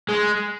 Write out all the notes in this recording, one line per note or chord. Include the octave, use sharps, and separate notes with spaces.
G#3